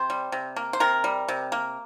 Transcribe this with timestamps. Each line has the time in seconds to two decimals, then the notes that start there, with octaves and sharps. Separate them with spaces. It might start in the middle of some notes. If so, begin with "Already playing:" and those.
Already playing: C3 C5
0.10 G3
0.32 C3
0.56 A#3
0.73 C5
0.80 C3 A#4
1.04 G3
1.28 C3
1.52 A#3